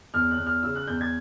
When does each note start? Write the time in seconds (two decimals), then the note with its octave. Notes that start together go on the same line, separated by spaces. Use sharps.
0.14 E2 F6
0.31 F#6
0.38 E2
0.46 F6
0.63 C#3 E6
0.75 F#6
0.87 E2 G6
1.01 G#6